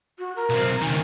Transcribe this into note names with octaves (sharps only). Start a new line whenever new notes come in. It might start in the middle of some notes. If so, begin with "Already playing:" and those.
F#4
A#4
B1 C4
C#2 D#3 G#5